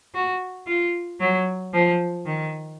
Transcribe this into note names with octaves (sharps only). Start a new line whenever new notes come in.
F#4
F4
F#3
F3
D#3